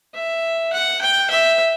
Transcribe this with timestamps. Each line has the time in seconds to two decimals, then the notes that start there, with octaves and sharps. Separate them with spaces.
0.14 E5
0.73 F#5
1.01 G5
1.30 E5